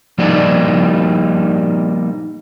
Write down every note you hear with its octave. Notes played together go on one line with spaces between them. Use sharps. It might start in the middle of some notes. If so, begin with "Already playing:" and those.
F3 G3 A#3 D#4 D5